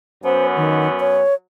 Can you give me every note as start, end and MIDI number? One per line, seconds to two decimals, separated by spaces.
0.24 1.22 42
0.24 1.22 59
0.24 1.22 61
0.24 0.47 72
0.56 0.88 51
1.00 1.34 73